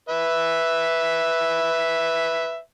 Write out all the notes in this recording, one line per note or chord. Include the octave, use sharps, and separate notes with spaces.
B4 E5